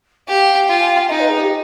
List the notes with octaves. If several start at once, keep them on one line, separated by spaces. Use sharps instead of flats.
G4 F5
F4 G5
G#5
G5
F5
D#4 D#5
B4
G#4
G4